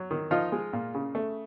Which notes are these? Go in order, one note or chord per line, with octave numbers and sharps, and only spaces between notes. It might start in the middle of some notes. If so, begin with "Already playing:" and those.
Already playing: F#3
D#3
F3 D#4 F4
G#3
A#2
C#3
A3